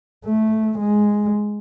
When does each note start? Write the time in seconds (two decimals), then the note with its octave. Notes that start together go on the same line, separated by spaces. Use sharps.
0.25 A3
0.79 G#3